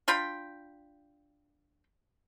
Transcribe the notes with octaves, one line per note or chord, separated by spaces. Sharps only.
D4 F4 G5 B5